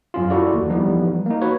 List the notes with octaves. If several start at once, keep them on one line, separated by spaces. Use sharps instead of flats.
F#2 C#4 F4
E4 F#4 A4 D5
D#2
E3 F3 G3 B3 D#4
A#3 D#4
F#4 B4 C#5